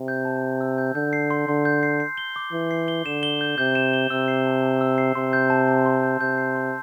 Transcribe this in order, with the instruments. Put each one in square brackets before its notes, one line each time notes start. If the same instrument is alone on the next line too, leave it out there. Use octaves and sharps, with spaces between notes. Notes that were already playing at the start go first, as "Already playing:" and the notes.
Already playing: [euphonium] C3
[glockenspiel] G6
A5
A5
E6
G6
[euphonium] D3 [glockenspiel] G6
[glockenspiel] C7
C6
[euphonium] D3 [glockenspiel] C6
[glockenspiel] G6
C7
C7
G7
D6
[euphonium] E3 [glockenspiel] D6
[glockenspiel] C7
G7
[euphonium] D3 [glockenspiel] E7
[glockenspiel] G7
G6
[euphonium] C3 [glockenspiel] G6
[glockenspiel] E7
G7
[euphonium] C3 [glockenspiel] E6
[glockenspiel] C7
A5
A5
E6
C7
[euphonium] C3 [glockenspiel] C6
[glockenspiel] G6
A5
A5
C6
G6
[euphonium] C3 [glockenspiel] G6
[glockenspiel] C7
C6